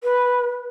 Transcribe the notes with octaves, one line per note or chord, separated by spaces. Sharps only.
B4